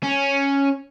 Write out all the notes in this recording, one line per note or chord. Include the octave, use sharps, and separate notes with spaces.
C#4